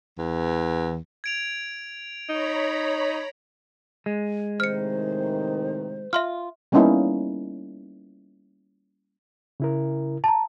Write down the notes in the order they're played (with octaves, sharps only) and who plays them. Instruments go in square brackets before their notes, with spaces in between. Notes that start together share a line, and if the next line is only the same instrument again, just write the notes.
[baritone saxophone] E2
[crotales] G#6 D7 F7
[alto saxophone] D#4 [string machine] C#5 A#5 B5
[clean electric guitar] G#3
[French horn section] A2 C3 D#3 [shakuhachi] C5 [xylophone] F6 C#7
[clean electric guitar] F4 [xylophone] E5 C6 F6
[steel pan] G3 A#3 B3 C#4 D#4 E4
[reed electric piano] C#3 E4 A#4
[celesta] A5 A#5